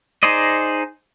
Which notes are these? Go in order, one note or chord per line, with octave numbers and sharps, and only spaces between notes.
D#4 G#4 C5 D5 D#5